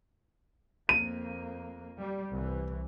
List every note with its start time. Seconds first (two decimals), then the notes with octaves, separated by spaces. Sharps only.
0.89 F2 A#3 D#7
1.99 G3
2.32 C2 E3